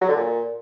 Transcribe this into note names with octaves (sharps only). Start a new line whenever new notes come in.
F#3
D3
A#2